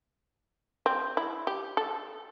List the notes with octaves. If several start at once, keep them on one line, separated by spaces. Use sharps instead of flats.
C4
E4
G4
A4